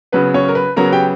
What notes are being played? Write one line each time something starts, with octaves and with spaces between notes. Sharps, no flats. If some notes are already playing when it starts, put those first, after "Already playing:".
C#3 F#3 B3 B4
C#4 C#5
A#4
B4
C#3 F#3 B3 A#4 A#5
G4 G5